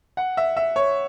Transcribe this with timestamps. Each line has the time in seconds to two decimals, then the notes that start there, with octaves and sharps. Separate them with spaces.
0.17 F#5
0.37 E5
0.56 E5
0.76 C#5